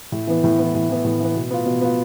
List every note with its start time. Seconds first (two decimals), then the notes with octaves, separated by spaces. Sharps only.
0.12 A2
0.27 E3 B3
0.44 A2
0.59 E3 B3
0.74 A2
0.89 E3 B3
1.04 A2
1.20 E3 B3
1.35 B2
1.50 B3 F4
1.66 B2
1.81 B3 F4